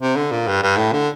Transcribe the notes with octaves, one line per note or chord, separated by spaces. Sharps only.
C3
D3
A#2
G2
G2
A2
D3